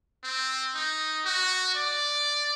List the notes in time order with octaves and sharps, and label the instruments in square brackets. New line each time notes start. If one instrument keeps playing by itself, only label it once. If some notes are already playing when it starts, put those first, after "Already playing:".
[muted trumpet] C4
D#4
F#4
D5